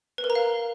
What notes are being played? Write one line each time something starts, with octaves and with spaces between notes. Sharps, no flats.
B4
A#4
A#5
F5